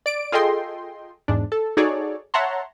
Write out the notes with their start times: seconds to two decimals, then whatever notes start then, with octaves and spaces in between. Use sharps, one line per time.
0.06 D5 D7
0.32 F4 G#4 A4 D#5 G5 C6
1.28 E2 G#2 D4
1.52 A4
1.77 D#4 F#4 G#4 A4 C#5 D5
2.34 C#5 E5 F#5 A5 A#5 C6